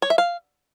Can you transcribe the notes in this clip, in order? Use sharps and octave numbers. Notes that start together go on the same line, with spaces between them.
C#5
E5
F5